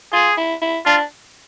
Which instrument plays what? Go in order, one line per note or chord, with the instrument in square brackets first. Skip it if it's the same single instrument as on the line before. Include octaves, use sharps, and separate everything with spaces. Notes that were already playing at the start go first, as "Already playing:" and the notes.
[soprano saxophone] F4 [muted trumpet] G#4
[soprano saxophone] E4
E4
[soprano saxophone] D4 [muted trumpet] F4